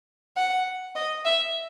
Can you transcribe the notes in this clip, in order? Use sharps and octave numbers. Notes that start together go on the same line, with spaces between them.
F#5
D#5
E5